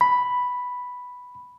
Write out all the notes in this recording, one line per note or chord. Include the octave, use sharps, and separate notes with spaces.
B5